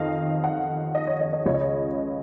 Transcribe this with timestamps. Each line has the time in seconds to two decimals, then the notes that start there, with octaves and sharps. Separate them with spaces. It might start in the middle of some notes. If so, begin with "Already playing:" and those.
Already playing: F2 D#3 D#5 F5
0.44 F#5
0.95 D#5
1.07 C#5
1.21 D#5
1.33 D#5
1.46 C#2 C#3 C#5
1.54 D#5
1.61 C#5